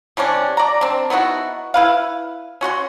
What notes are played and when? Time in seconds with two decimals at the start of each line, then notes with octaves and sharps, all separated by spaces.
0.17 C3 G3 C#4 D4
0.57 D5 A#5
0.81 C4 D4
1.10 B3 D#4 E4 F#4
1.74 E4 B4 F5
2.61 C#4 F#4 F#5 C6